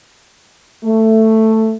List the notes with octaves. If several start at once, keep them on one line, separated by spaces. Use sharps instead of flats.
A3